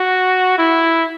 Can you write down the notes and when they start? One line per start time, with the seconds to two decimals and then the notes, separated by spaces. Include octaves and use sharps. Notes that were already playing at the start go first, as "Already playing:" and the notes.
Already playing: F#4
0.58 E4